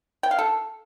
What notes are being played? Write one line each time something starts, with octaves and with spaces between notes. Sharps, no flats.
G5
F5
A4